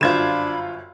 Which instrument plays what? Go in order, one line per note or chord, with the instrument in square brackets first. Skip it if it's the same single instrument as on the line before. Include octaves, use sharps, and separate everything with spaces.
[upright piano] G1 F#2 C5 [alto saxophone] D4 [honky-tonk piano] F4 G#6 E7 [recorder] B5